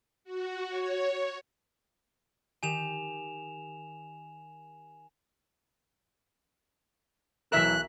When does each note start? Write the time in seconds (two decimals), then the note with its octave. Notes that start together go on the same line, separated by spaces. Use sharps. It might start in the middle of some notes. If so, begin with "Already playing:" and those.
0.24 F#4
0.68 C#5
2.63 D#3 G4 G#5 E7 F7
7.52 B1 E3 A#4 E5 F#6 E7